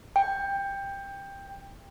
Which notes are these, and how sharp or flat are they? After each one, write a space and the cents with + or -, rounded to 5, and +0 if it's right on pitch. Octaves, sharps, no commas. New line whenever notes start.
G5 +15